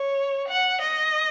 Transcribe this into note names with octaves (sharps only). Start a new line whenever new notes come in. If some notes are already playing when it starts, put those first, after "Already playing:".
Already playing: C#5
F#5
D#5